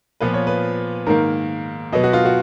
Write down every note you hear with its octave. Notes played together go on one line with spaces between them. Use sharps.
A#2 F3 B3 B4
C#5
B4
G#2 D#3 A#3 A#4
B2 F#3 B3 D#5
F#4
F4
F#4